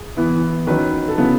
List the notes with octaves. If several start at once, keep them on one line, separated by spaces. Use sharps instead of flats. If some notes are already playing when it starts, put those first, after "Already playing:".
Already playing: G#4
E3 B3 E4
D#3 F#3 C#4 B4
A4
C#3 F#3 B3 E4 B4